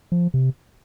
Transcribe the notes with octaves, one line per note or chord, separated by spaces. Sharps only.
F3
C3